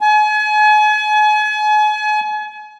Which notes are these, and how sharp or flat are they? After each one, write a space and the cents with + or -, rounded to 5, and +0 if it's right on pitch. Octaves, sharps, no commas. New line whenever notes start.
G#5 +35